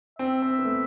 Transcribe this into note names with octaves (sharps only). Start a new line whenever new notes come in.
C4 E5
C4
B3
A3